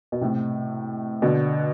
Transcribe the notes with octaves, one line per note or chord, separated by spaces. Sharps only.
B2
A2 C3
B2 D3